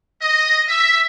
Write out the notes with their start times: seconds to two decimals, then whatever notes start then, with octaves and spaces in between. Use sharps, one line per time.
0.22 D#5
0.68 E5